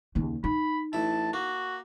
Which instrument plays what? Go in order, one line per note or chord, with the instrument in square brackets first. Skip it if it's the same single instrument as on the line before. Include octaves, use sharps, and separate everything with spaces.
[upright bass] D#2 C#3
[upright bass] D#4 [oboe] B5
[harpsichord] A1 E4 [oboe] A5
[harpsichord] A#3 [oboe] F#4